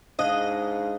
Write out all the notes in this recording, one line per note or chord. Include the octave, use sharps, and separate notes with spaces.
G#2 D4 D#5 F5 F#6